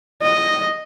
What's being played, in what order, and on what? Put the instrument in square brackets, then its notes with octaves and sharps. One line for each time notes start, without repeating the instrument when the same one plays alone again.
[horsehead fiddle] D#5